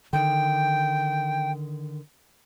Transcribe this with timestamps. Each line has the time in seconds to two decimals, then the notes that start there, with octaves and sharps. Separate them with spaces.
0.13 D3 D#3 G5